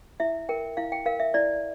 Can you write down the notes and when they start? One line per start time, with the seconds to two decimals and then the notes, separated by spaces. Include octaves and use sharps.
0.20 E4 E5
0.49 A#4 G5
0.77 E4 F5
0.92 G5
1.06 A#4 F5
1.20 E5
1.34 E4 D5